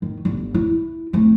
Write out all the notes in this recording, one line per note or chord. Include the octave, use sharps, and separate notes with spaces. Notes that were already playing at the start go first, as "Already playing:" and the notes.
D#3
G1
E4
A3 C4